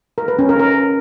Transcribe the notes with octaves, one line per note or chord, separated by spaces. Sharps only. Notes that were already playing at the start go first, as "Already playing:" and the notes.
A#4
B4
C#4
A#4
A#4